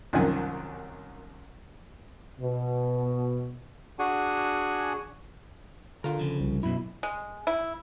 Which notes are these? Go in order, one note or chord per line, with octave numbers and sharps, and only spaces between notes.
C2 F#2 D#3 F3 F#5 G#5
B2
D4 F#4 G#4 F#5 G#5
D3 F4 A#4
C#3 F3
C2
F#2 B2 E4
G#3
E4